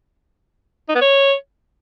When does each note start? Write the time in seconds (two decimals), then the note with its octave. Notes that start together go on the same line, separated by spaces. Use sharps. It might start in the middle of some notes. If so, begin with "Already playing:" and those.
0.89 D#4
0.95 B3
1.01 C#5